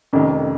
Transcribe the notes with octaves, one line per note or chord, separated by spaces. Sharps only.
F1 F2 D#3 C#4